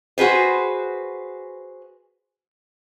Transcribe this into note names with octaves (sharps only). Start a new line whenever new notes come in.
F#4 G#4 B4 C5